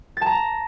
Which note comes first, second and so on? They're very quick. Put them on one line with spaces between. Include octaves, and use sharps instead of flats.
A6 A5 A#5